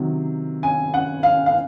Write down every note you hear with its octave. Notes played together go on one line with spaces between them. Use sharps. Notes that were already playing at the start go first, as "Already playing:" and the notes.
Already playing: C3 D#3 F#3
G#5
F#5
F5
F5